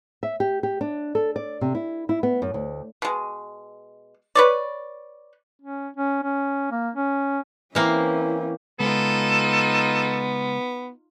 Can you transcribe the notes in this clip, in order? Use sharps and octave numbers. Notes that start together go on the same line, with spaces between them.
E5
G4
G4
D4
A4
D5
C3
E4
E4
B3
F#2
D2
B2 G#3
B4 C#5 D5
C#4
C#4
C#4
A#3
C#4
E3 A#3 C4 C#4 E4
C#3 G#3 B3 D#4 F4 A4